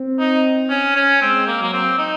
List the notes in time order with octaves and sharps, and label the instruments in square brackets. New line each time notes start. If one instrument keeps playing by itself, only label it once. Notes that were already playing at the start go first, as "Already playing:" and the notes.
Already playing: [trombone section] C4
[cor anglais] D#4
C#4
C#4
[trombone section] G#3 [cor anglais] C4
[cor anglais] A#3
[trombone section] F#3 [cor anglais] A#3
[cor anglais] C4
D#4